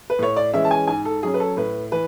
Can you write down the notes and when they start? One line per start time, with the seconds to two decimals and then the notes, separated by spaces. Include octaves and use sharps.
0.10 B4
0.19 A2 C#5
0.37 D5
0.53 E3 G#3 C#4 E5
0.65 A5
0.71 G#5
0.87 G#2 G#5
1.05 A4
1.23 F#3 C#4 G#4
1.34 B4
1.40 A4
1.57 A2 B4
1.92 E3 B4